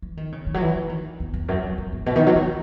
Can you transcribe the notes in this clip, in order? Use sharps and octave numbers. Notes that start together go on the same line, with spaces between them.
E3
D#3
C#3
D#3
F#3
E3
E3
D#3
E2
E2
F#2
F#2
E2
G#2
B2
D#3
F#3
E3